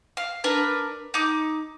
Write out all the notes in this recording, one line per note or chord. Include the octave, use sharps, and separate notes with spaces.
F5
D4 A#4 B4
D#4 D6